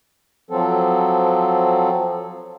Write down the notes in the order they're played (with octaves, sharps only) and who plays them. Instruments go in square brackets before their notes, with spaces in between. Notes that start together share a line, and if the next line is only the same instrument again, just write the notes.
[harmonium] F3 F#3 C4 A4